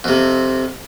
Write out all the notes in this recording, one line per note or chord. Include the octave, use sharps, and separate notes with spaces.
F2 C3